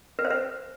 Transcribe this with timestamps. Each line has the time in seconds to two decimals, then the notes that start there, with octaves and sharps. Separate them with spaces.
0.19 B4
0.25 C5
0.30 B4